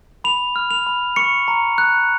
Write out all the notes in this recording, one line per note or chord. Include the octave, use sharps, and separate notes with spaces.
B5 F7
F6
F7
B5
C#6 C#7
A#5
F#6